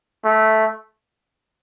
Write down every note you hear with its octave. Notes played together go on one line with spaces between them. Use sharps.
A3